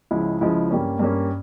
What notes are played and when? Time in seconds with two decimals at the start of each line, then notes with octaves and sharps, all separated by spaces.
0.11 C#2 C#3 F3 G#3 E4
0.41 C#2 C#3 F3 G#3 E4
0.70 G2 G3 A#3 C#4
0.99 G2 G3 A#3 C#4